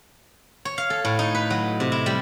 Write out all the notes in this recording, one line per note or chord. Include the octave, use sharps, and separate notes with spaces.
C#5
F5
A4
A2
D#4
B4
F#3
C3
E4
G3